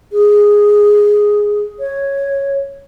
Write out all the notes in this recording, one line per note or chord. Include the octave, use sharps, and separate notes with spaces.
G#4
C#5